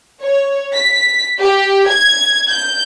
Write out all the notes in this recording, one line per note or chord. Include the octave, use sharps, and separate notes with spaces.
C#5
B6
G4
G#6
G6